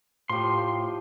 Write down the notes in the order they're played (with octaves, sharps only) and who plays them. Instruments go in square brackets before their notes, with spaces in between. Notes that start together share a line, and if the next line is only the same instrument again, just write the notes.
[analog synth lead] A2 [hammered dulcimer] F3 G4 [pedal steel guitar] C6